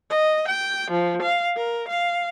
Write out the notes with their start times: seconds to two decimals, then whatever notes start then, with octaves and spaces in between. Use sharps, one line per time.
0.10 D#5
0.48 G5
0.91 F3
1.22 F5
1.56 A#4
1.88 F5